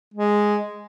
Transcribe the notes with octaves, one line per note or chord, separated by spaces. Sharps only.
G#3